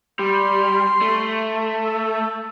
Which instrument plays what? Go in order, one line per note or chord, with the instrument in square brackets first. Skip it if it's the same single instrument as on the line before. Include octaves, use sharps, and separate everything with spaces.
[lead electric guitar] G3 [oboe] C6
[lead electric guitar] A3
[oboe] A4